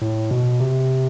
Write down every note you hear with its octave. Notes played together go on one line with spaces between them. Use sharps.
A2
B2
C3